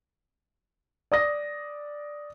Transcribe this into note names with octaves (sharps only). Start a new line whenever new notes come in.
D5 D#6 A#6